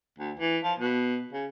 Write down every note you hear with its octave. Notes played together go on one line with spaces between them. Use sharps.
D2
E3
F3
B2
C#3